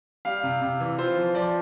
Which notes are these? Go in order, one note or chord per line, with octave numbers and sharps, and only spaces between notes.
G3 F5
C3
C3
E3
F4 C5
F3
F3 D5